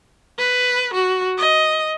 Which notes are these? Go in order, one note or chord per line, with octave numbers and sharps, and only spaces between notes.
B4
F#4
D#5